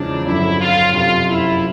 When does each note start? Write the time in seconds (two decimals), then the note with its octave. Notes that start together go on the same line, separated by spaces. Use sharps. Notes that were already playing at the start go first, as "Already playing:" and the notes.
Already playing: E2 C#3 F3 G#3 D4
0.26 G1 F2 D3 F#3 E4
0.60 F4
0.93 F#1 F2 C3 F3 F4
1.29 E4